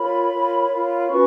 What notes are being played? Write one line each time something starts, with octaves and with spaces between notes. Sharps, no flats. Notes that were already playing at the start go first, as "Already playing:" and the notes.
Already playing: F4 A#4 C#5 B5
F4 A#4 C#5
F4 A#4 C#5
C#4 F#4 B4 C#6